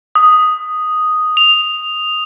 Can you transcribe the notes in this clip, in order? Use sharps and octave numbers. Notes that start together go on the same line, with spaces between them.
D#6
F7